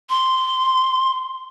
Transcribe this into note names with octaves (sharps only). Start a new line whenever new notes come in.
C6